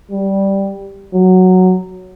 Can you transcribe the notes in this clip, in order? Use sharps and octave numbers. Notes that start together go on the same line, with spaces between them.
G3
F#3